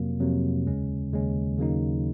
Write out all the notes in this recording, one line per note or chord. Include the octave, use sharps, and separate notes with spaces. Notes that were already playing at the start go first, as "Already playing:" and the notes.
Already playing: F2 C3 F#3 A#3
F2 C3 F#3 A#3
D#2 C#3 G#3 C#4
D#2 C#3 G#3 C#4
D#2 C#3 F#3 A#3 D#4